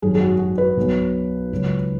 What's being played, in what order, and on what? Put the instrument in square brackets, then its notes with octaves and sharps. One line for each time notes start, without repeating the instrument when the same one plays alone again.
[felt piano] G#1 F#2 F#3 G#4
G#4
F#4
F#4
B4
B1 B2 F#3
C#2 C#3 F#3